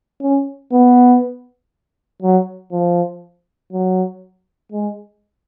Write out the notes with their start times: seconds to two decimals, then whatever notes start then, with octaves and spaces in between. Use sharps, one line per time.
0.21 C#4
0.72 B3
2.22 F#3
2.72 F3
3.73 F#3
4.72 G#3